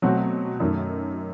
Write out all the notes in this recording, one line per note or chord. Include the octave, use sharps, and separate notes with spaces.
B2 F#3 A3 C4 F#4
F#2 D#3 A3